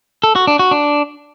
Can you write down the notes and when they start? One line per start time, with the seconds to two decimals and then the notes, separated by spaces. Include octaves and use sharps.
0.24 A4
0.35 F#4
0.47 D4
0.59 F#4
0.71 D4